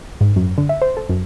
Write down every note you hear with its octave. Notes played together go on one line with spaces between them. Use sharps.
G#2
F#2
D3
E5
C5
A4
F#2